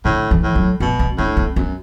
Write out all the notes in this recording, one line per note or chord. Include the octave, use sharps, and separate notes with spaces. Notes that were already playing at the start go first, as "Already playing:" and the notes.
A2 D3
E3
A2
F#3
B2 A3
B3
A2 D4
B3
F#2 B3